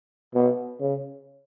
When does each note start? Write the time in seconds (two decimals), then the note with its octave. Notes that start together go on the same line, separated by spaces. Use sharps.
0.35 B2
0.81 C#3